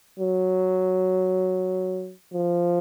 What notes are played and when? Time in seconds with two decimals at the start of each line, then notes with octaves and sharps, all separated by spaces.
0.19 F#3
2.33 F3